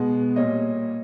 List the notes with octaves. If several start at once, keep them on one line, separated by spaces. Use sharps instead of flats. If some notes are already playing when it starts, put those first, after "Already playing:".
Already playing: B2 G#3 B3
A#2 G3 A#3 C#5 D#5